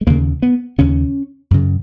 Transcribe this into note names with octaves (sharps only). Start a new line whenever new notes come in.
G#3
D#2 C#3 A#3
B3
D#2 C#3 C#4
F#2 C#3